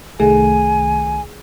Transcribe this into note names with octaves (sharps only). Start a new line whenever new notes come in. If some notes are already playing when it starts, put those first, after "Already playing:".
C2 D#3 A3 G#4 G#5